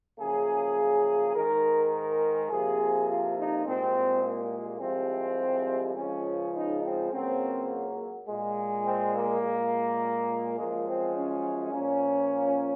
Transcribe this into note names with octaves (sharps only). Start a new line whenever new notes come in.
F#2 C#3 F3 A#3 G#4
G#2 D#3 G#3 A#4
A#4
F2 C3 F3 A#3 G#4
F4
D#4
C2 A#2 G#3 C4
A#3
C2 C3 F3 G#3 C4
C#2 C#3 F3 G#3 C#4
D#4
C4
C#2 C#3 F#3 A#3 C4
A#2 G#3
C4
A#3
A#2 G#3
F#2 F3 G#3 A#3
C4
C#4
A#2 F3 A#3 C#4